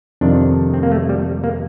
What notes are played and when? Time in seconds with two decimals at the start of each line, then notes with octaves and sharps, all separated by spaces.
0.21 F2 C3 D#3 D4
0.74 C4
0.83 A#3
0.92 A3
1.09 G3
1.44 A#3